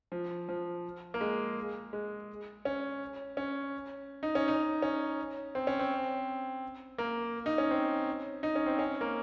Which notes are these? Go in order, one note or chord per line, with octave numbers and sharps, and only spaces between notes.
F3
F3
A#3
G#3
G#3
C#4
C#4
D#4
C#4
D#4
C#4
C4
C#4
C4
A#3
D#4
C#4
C4
D#4
C#4
C4
C#4
A#3